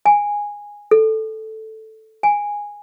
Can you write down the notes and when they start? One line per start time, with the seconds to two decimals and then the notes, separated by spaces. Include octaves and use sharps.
0.06 G#5
0.91 A4
2.23 G#5